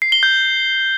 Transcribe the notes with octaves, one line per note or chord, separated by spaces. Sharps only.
C7
G7
G6